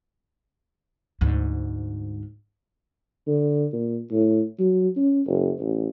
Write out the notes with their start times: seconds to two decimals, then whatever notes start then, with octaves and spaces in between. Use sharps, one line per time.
1.21 D2 G#2
3.27 D3
3.73 A#2
4.12 A2
4.59 F#3
4.97 C#4
5.27 F#1
5.60 A1